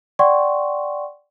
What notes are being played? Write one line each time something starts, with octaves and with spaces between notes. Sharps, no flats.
D5 F#5 G5 C6 C#6